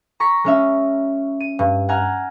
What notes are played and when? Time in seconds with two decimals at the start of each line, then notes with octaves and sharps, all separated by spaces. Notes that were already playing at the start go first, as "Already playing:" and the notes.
0.20 A#5 C#6 A#6 B6
0.44 G#3 C#4 E5
1.40 D#7
1.59 G2
1.89 F#5 G#5 A#5 F6